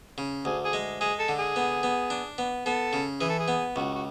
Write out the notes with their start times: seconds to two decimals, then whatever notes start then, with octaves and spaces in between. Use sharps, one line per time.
0.18 C#3
0.45 D2 G#4
0.64 G#4
0.73 G#3
1.01 G#3 G#4
1.19 A4
1.29 D3
1.38 G#4
1.56 B3
1.83 B3
2.10 D4
2.38 B3
2.66 B3 A4
2.93 C#3
3.20 E3 G#4
3.29 A4
3.39 G#4
3.48 B3
3.76 C#2 F#4
3.95 F#4